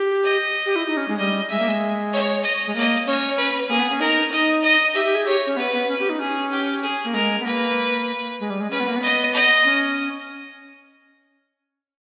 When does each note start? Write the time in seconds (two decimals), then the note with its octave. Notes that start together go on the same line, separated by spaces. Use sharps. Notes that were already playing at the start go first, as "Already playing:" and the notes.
Already playing: G4
0.24 D#5
0.66 G4
0.76 E4
0.87 D#4
0.97 C#4
1.08 G#3
1.18 G3 D#5
1.49 G#3 E5
1.59 A#3
1.68 G#3
2.13 C#5
2.43 D#5
2.67 G#3
2.75 A#3 D#5
3.06 C#4 C#5
3.38 B4
3.69 A#3 G#4
3.79 B3
3.91 C#4
4.00 D#4 A#4
4.31 D#4 D#5
4.63 D#5
4.94 G4 E5
5.05 G4
5.15 G#4
5.25 G4 C#5
5.46 C#4
5.57 B3 B4
5.73 B3
5.88 C#4
5.99 G4
6.10 D#4
6.19 C#4 G#4
6.51 G4
6.83 G#4
7.05 A#3
7.14 G#3 A#4
7.40 B3
7.45 A#3 B4
8.40 G#3
8.50 G3
8.60 G#3
8.71 C#4 B4
8.80 B3
8.87 A#3
8.96 B3
9.02 D#5
9.33 D#5
9.65 C#4